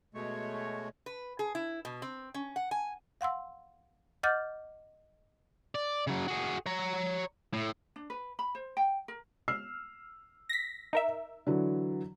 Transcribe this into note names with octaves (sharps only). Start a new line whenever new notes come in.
B2 G#3 A3 C#5
B4
G#4
E4
B2
C4
C#4
F#5
G#5
F5 F#5 C6 E6
D#5 F#5 D6 F6 G6 A6
D5
C#3 F#3
F#4 G#4
C#5 A#5
A2
D4
B4
B5
C5
G5
A#4
E6 F6 C7
A#6 B6
D#4 A#4 E5
D3 E3 F#3